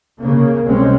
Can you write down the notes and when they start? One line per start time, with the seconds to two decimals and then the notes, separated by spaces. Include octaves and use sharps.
0.20 C#3 A#3
0.65 C2 G#3 C4 C#4